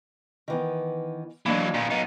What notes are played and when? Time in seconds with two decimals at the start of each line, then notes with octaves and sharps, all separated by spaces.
0.48 D#3 E3 B3
1.46 E3 F#3 A#3 D4 D#5
1.74 A#2 B3
1.91 B3 D#4 F5